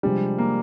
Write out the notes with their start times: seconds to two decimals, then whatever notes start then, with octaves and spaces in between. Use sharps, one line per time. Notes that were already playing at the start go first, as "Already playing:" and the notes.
0.03 C3 F3 G3 G#3 D4
0.38 A#3